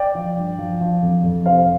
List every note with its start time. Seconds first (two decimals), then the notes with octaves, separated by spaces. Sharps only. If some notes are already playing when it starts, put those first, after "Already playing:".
Already playing: D5 G5
0.15 F3
0.37 G2
0.59 F3
0.81 F3
1.03 F2
1.24 F2
1.46 C3 C5 F5